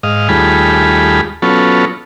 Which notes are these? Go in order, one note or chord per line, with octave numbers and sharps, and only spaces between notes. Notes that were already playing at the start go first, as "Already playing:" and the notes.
G#2 D#5 F5
D#2 G3 A3 F4 G#4 B5
F#3 B3 C#4 F4 A4